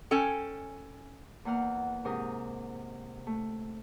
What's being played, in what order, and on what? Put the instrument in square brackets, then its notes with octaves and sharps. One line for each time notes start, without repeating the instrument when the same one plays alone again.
[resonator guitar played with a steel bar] C#4 A4 G5 G#5
[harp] E2 A#3 F#5 F6
G#2 C3 A#4 D#6
A3